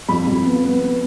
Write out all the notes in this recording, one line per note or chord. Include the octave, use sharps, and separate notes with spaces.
F2 B5
F2
B3
B3
B3